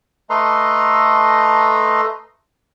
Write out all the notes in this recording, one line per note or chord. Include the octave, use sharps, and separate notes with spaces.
A3 A4 B4 D#5 A#5 C6